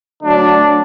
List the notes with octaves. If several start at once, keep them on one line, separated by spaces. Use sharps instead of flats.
D3 F#3 A3 D4